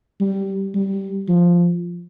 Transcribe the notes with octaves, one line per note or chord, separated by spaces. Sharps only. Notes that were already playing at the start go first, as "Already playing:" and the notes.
G3
G3
F3